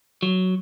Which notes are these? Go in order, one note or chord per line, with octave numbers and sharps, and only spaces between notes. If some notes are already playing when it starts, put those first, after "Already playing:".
F#3